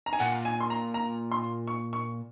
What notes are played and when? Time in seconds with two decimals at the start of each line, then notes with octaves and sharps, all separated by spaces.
0.06 A#5
0.13 G#5
0.20 A#2 F#5
0.45 G#5
0.61 C6
0.70 A#5
0.94 A#5
1.32 C6
1.68 C#6
1.93 C#6